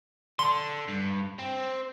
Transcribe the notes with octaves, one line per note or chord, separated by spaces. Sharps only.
D3 C6
G2
C4